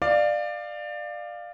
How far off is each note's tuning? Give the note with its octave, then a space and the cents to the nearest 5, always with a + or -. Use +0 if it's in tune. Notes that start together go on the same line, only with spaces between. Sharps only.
D5 +20 F5 +0